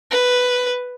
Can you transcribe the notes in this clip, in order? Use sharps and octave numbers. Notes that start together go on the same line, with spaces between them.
B4